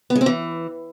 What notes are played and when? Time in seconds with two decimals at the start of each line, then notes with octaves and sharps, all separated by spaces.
0.10 B3
0.15 G#3
0.21 C4
0.26 E3